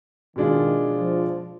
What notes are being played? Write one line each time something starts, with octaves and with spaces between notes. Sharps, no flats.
B2 D#3 G#3 D4 F4
F3